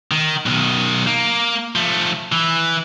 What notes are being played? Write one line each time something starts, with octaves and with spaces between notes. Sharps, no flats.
D#3
B1 D#3
A#3
F3 A3
E3